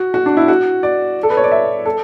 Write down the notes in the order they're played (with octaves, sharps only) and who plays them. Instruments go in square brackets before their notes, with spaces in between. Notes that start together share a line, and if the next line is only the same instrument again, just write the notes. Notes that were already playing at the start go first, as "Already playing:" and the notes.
Already playing: [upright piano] F#4
F#4
D4
E4
F#4
D5
A4
B4
C#5
D5
E5
A4